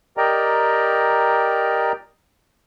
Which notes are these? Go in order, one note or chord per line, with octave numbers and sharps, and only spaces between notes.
G4 A#4 D5 D#5 G5 A#5